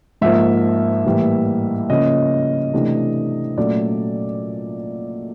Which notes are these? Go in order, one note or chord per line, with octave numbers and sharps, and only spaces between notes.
G#2 F3 A#3 E5
A2 E3 G3 A#3
C#3 F3 A#3 C#4 D#5
C3 E3 A3 D4
A#2 F#3 A3 C#4 D5